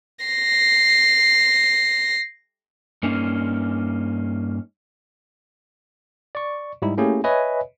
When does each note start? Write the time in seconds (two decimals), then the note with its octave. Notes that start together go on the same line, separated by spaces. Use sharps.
0.26 A#6 C7
3.03 G2 A#3 C#4 D#4
6.35 D5 C#6
6.82 G#2 G3 D#4 E4
6.98 A3 A#3 C#4 E4 G4 G#4
7.24 B4 C#5 D#5 E5 G#5 B5